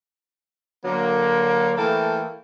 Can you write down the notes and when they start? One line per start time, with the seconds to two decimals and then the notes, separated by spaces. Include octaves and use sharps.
0.85 D3 F#3 A#3
1.77 E3 A3 A#3 A4 G5 A5